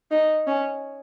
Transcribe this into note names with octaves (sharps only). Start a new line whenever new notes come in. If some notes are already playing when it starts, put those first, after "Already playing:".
D#4
C#4